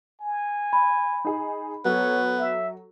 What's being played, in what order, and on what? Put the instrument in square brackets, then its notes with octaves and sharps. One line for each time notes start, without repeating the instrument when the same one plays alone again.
[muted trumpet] G#5
[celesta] B5
[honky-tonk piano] D#4 G#4
[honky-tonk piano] F#3 A4 [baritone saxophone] B3 [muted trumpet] C#5
[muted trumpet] E5